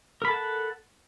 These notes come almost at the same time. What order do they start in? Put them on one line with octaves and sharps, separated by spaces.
A#4 B5 A4 A5 F#5